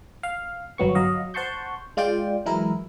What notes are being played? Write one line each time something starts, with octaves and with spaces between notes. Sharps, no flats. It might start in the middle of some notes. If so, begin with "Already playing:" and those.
F5
G1 F#3 B3 C#6
F#3 D#5 F5
C5 F#5 A5 C6 C#6 G6
G#3 F4 D5 G5
E3 F#3 G#3 E4 A#4